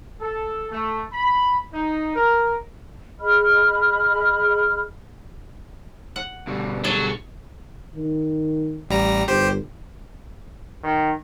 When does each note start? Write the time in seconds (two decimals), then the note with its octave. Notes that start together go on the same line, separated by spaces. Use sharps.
0.20 A4
0.71 A3
1.12 B5
1.72 D#4
2.14 A#4
3.19 G#4 D#5 B5 F6
6.16 F#5
6.47 B2 D3 G3
6.84 F#3 G#4 A4
7.95 D#3
8.89 A1 G3 A#5
9.28 G1 G4 C5
10.83 D#3